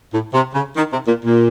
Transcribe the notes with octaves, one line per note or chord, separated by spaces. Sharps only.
A2
C3
C#3
D#3
C3
A#2
A#2